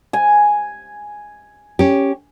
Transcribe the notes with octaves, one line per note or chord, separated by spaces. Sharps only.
G#5
C#4 G4